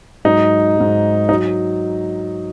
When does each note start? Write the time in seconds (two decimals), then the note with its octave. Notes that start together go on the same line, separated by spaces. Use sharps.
0.25 G#2 F#3 D#4
0.77 G#2 F#3
1.29 D#4
1.31 F#3